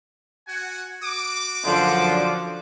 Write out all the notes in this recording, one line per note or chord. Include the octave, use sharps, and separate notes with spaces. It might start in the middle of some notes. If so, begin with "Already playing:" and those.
F#4 F#5 G#5
F#4 D6
F#2 D3 F3